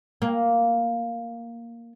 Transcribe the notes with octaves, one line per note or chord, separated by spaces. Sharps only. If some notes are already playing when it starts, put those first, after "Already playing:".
A#3